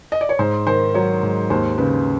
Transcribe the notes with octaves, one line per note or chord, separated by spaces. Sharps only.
D#5
D5
C#5
G#2 C5
D#3 C5
F#3 C#5
G#2
D#2 C5
C#3 B4